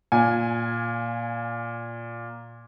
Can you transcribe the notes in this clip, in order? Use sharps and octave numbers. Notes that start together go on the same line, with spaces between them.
A#2 G#5